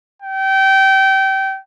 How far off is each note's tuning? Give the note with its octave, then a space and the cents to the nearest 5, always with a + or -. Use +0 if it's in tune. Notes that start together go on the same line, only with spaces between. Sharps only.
G5 -25